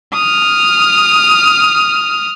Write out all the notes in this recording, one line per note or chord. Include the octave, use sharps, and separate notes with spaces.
D#6 F6